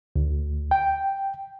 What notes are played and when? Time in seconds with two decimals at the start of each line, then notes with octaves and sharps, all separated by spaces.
0.16 D2
0.71 G5